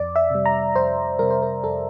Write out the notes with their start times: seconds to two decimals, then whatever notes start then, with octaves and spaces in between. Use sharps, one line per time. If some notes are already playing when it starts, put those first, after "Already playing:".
Already playing: F2 D5
0.16 E5
0.30 C3 G3
0.46 A#5
0.75 F2 C5
1.19 C3 G3 A#4
1.30 C5
1.43 A#4
1.64 F2 A4